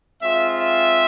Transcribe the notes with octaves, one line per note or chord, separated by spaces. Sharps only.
G#3 C4 F4 E5
E5